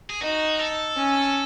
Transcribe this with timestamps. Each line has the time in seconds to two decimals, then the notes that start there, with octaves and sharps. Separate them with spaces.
0.10 G#4
0.22 D#4 F#4
0.59 A4
0.97 C#4